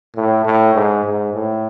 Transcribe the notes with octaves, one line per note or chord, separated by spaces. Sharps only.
A2
A2
G#2
G#2
A2